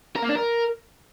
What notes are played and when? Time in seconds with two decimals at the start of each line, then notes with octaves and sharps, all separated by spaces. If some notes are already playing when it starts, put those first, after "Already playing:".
0.16 A#4
0.23 A#3
0.29 D4
0.36 A#4